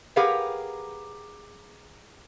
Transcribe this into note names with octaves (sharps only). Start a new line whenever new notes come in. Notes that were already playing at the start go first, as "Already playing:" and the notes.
G4 G#4 A#4 B4 F5 F#5